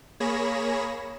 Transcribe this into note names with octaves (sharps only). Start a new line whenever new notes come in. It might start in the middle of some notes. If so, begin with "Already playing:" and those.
A#3 G#4 C#5 B5 A#6 E7